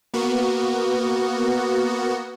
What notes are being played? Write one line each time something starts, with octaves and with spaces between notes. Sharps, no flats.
A#3 B3 F#4